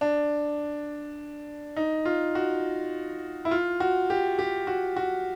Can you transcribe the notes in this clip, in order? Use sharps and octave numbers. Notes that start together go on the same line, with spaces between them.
D4
D#4
F4
F#4
E4
F4
F#4
G4
G4
F#4
F#4